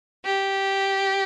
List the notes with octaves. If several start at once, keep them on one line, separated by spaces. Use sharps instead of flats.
G4